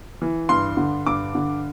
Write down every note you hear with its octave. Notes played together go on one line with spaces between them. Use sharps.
E3
G2 C6
D3
G2 D6
D3